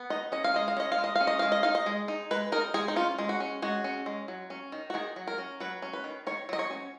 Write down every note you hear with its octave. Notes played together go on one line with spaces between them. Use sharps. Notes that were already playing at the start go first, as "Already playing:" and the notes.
Already playing: B3
D#4 D#5
C#4 D#5
F5
G#3 D#5
F5
C#4 D#5
F5
G#3
D#5
F5
C#4
D#5
G#3 F5
D#5
D#4 F5
D#5
G#3
D#4
G#3 B4
D#4 A#4
G#3 G#4
D#4
C#4 F4
G#3
F#4
C#4
G#3 F#4
C#4
G#3
F#3
C#4
D#3
F#4
D#3 G#4
F#3
A#4
C#4
F#3 B4
C#4
B4
D#3
D#3 C#5
F#3 D#5
C#5
C#4